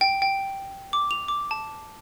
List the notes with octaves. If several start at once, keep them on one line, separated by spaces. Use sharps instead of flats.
G5
G5
D6
F7
D6
A5